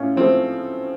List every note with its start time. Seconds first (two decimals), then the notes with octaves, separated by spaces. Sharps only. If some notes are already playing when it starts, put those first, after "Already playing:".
Already playing: A2 C#4 F4
0.16 F3 C4
0.20 A3